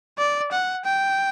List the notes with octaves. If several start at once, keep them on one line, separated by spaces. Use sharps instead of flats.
D5
F#5
G5